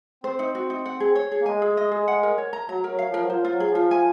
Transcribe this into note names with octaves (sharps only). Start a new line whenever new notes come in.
C4 C5
D#4
F#4
D#4
F#5
G#4
C#5
G#4
A#3
G#3 G#5
G#4
D#5
G#4
F#5
A#4
C#5
A#5
F#3 A#5
F#3 A#4
F5
F3 A#4
F#3
F3 C5
F4
F#3
G#4
F3
F4
G#5